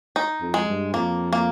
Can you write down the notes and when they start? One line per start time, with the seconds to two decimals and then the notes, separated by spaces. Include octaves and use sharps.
0.16 D#4
0.41 F2
0.54 G#3
0.68 G2
0.94 F2 A#3
1.33 A#3